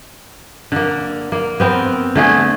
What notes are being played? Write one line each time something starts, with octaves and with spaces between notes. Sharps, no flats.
D3 A#3
A#3
B3 C4 A#4
D3 A3 G#4